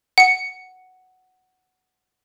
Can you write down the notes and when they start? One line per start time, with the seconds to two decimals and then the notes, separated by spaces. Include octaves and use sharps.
0.18 F#5 C#7